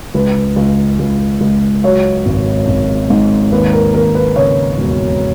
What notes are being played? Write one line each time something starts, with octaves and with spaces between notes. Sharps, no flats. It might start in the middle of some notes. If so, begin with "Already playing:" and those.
C#2 B4
C#2
C#2
C#2
F#3 C#5
G#1
G#1
G#2
D#2 B4
A#4
D#2 A#4
B4
C#3 C#5
E1